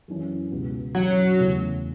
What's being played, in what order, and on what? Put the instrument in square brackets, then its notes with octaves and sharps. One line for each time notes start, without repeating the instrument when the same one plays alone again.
[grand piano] F#2 E3 C#4
C#2 B2 B3
[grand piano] F#2 E3 C#4 E4 [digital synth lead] F#3
[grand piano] E2 C#3 A3 C#4